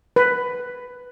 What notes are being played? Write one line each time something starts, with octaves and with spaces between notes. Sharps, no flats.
B4